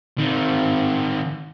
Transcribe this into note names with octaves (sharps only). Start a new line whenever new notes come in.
D#3 C4